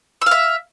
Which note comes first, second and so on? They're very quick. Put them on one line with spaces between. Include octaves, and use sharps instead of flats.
E6 F5 E5